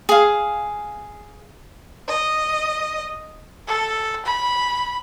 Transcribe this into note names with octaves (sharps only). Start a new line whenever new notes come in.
G#4 F5
D#5
A4
B5